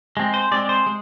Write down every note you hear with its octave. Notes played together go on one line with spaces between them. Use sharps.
G#3 C4
C5
G#3 C4 D5
C5
G#3